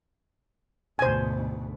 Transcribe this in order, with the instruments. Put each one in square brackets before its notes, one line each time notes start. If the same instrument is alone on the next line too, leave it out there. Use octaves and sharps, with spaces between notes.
[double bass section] D2 G#2 B2 [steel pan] C5 G#5